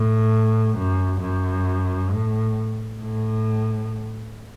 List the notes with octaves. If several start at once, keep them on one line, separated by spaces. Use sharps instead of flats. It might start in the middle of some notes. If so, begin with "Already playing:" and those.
Already playing: A2
F#2
F#2
A2
A2